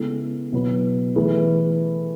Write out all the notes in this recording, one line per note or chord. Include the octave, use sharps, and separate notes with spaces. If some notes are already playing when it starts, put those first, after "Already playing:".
Already playing: C#3 G#3 B3 E4 A4
B2 F#3 B3 E4 B4
E3 A3 E4 G#4 B4